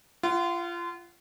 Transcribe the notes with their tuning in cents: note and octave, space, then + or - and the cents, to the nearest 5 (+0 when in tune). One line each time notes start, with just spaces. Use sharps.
F4 -25 F#5 +15